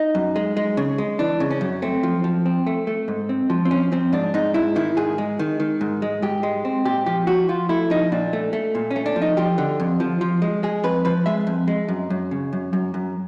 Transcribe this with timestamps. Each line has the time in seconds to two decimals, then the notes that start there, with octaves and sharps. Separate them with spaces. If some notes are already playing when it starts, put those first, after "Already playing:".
Already playing: D#4
0.15 F#2
0.36 G#3
0.57 G#3
0.77 C#3
0.98 G#3
1.19 E3 D4
1.40 C#3
1.51 C#4
1.61 F#2
1.82 A3 C4
2.03 F3
2.24 F3
2.46 C4
2.67 A3
2.87 A3
3.08 G#2
3.29 C4
3.50 F3
3.65 C4
3.71 F3 C#4
3.92 F3 C4
4.13 G#2 D4
4.34 G#2 D#4
4.54 G#2 E4
4.76 D#3 E4
4.97 G#2 G#4
5.18 G#3
5.39 D#3
5.60 D#3
5.81 G#2
6.02 G#3
6.22 G#2 G4
6.43 G#3
6.65 C4
6.86 A#2 G4
7.06 F3 G4
7.27 F3 F#4
7.49 F3 F4
7.69 A3 E4
7.90 F3 D#4
8.12 A#2 D4
8.33 A3
8.53 A3
8.75 A#2
8.91 C#4
8.96 A3
9.06 D4
9.16 F3
9.22 D#4
9.37 F3 G4
9.58 D3
9.80 F2
10.00 F3
10.21 F3
10.42 G#3
10.63 G#3 G#4
10.84 F2 B4
11.05 F3 B4
11.26 G#3 E5
11.47 F2
11.68 G#3
11.88 F#2
12.10 F#2
12.31 C#3
12.53 F#2
12.73 F#2
12.94 F#2